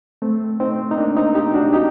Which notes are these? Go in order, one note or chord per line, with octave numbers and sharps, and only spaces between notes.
A3 C4
C4 D#4
D#4
A#3 D4
C4 D#4
D#4 G4
D4 F#4
D#4 G4